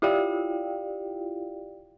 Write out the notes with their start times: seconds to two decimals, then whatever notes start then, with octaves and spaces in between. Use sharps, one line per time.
0.02 E4 F4 G4 D5 F5 G5